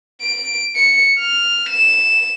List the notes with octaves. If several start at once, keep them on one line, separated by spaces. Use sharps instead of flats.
D7
C#7
F6
E7